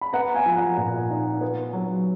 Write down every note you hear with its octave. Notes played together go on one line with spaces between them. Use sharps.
B5
B3 F#5 A#5
F5 G#5
F3
F#5 A#5
A#2
D#4
B3
F#3